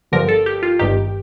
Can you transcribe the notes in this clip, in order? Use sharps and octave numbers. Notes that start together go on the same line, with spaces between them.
G1 G2 D3 F3 A#4
A4
G4
F4
G1 G2 D#3 G4